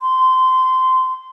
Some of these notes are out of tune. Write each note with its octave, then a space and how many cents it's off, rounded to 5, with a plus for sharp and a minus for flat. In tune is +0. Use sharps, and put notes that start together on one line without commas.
C6 -20